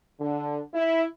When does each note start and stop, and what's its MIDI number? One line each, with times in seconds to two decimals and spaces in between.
0.20 0.59 50
0.74 1.03 64